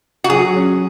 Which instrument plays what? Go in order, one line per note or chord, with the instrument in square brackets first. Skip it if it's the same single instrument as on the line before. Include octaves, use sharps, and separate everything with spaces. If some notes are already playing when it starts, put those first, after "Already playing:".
[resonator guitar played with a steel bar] F#4
[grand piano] F#3 [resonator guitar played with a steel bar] G#4
[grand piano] C#4